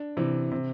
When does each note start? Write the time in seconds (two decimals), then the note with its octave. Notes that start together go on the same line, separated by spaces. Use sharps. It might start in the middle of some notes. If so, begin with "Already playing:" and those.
Already playing: D4
0.17 C3 E3
0.52 C3